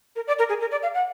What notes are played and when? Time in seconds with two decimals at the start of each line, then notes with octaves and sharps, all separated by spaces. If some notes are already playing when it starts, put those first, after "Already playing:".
0.16 A#4
0.27 D5
0.39 A#4
0.49 G#4
0.61 A#4
0.71 D5
0.83 F5
0.94 F#5